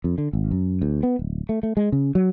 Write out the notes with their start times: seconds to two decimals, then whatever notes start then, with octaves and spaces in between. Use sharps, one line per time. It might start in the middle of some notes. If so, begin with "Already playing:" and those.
0.04 F2
0.18 D3
0.33 G#1
0.51 F#2
0.82 D2
1.03 B3
1.19 D1
1.49 A3
1.63 A3
1.77 G#3
1.92 C#3
2.15 F#3